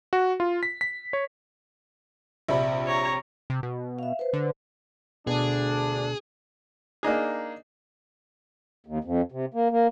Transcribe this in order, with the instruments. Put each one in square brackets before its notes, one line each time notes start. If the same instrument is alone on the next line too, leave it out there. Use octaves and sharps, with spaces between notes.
[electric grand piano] F#4
F4
B6
B6
C#5
[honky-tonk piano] A#1 C3 B5 [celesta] D5 E5
[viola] C#5 A#5
[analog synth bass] C3
B2
[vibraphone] E5 F5
B4 C5
[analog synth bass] D3
[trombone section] D2 D3 D4 [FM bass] B2 [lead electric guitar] G#4
[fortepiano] A#3 D4 D#4 G#4
[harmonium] D#2
F2
C3
A#3
A#3